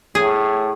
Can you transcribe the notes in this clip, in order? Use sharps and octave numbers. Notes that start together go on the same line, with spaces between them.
A2 G#4